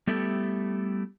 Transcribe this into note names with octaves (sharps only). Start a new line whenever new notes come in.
G3 A3 B3 E4 G4 A4